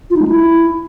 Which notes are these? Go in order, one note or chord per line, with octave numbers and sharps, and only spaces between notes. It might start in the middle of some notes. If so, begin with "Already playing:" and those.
F4
D#4
G#3
E4